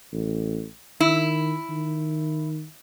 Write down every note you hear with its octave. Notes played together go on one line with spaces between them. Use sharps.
A1
D#3 E4
D#3